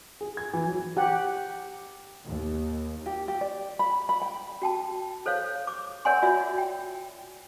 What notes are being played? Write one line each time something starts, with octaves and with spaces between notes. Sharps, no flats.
G#4
G#6
E3
F#3
G4 F#5
D#2
G4
G4
D5
B5
B5
G5
F#4 G5 A5
A4 C5 C#5 F5
D6
A#4 C#5 D5 F#5 G#5 C6
F4 F#4 D5 E5
G5